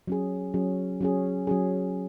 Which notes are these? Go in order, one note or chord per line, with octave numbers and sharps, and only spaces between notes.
F#3 C#4 G#4
F#3 C#4 G#4
F#3 C#4 G#4
F#3 C#4 G#4